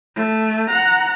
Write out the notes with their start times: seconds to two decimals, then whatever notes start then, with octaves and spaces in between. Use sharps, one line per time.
0.16 A3
0.68 F#5 A#5